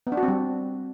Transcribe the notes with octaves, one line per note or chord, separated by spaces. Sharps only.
B3
D4
F#4
C4
G3